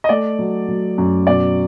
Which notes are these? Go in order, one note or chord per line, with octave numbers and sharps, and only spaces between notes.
D#5
A3 D5
F#3
F#3
F#2
B2 D5